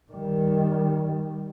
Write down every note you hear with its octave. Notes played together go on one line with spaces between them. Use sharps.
D#3 G3